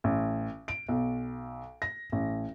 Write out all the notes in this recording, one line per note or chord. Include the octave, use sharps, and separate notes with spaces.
A1
D7
B1
A#6
A1